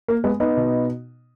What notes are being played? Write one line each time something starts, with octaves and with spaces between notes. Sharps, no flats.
A#3
G#3 B3
B3 D#4
B2